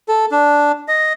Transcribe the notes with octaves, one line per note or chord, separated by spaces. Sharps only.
A4
D4
D#5